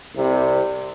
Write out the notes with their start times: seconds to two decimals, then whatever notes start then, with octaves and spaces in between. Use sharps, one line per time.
0.15 C2 C3 G3